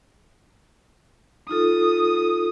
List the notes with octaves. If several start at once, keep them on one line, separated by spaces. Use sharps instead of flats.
D#4 F4 A4 D#6